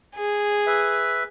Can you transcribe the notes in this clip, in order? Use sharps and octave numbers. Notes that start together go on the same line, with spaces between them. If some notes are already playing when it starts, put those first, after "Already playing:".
G#4
B4 E5